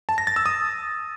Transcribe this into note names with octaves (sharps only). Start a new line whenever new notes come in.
A5
A#6
A6
E6
D#6